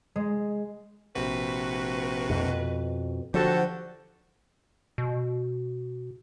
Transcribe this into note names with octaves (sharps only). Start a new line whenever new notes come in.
G#3
A#1 C3 F#4 B4
F2 B2
D3 F3 F#4 G4 A4
B2